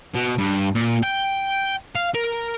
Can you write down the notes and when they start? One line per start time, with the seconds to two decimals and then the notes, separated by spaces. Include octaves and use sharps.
0.15 B2
0.38 G2
0.75 A#2
1.03 G5
1.95 F5
2.14 A#4